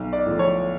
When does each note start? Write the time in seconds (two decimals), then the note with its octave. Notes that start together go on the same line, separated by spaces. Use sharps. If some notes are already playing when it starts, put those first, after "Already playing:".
Already playing: B1
0.13 D5
0.26 A2 F3
0.39 C#5